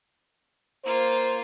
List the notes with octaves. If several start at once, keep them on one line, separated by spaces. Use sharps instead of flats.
A#3 F4 C5